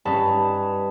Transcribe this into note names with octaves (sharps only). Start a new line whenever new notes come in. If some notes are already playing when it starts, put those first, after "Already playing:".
G2 C#4 D#4 B4 A5 E7